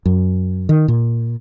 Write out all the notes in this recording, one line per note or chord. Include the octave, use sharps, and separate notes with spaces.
F#2
D#3
A#2